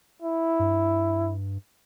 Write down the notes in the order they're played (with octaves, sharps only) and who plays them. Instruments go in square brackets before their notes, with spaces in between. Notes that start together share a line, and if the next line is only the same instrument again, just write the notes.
[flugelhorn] E4
[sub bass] G2